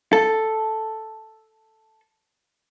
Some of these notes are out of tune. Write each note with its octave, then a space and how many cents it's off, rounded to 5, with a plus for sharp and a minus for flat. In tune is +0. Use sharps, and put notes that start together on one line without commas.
A4 +0